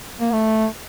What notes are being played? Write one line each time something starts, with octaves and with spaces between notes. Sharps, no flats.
A#3
A3